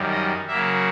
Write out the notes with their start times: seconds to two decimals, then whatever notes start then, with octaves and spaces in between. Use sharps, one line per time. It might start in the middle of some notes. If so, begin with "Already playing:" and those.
Already playing: F#2 D#3 G3
0.10 D#5
0.47 C#3 F#3 A#3 E5